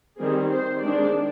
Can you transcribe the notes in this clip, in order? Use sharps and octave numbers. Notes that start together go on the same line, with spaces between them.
D#3 G3 C4 G#4
C5
D#3 G#3 D4 D5